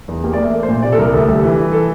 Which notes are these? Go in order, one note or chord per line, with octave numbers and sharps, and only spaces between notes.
E2
A#3 G4
D5
A#3
E5
A3
C5
A#2
C3 D5
A4
C2 A#4
D2 A4
G3
E3
E3
A4